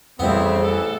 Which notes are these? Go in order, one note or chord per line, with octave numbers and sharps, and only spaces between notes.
A1 F2 C#3 G3 B3 C4 E4
E3 A4